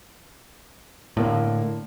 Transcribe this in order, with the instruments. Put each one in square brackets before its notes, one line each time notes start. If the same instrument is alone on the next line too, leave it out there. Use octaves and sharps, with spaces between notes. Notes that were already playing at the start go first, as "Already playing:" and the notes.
[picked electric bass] A2 [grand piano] D3 A#3